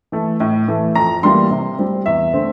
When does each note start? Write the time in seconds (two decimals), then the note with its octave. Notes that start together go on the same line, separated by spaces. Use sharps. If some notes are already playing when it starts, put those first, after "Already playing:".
0.12 E3 A3
0.40 A2
0.68 E3 A3
0.95 F2 A#5
1.23 E3 G3 A#3 C6
1.51 C3
1.79 G3 C4
2.06 E2 E5
2.33 D3 A3 C4